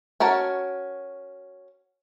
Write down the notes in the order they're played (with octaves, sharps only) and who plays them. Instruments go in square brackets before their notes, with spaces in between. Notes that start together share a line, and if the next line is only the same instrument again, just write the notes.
[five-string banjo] C#4 F#4 A#4 A5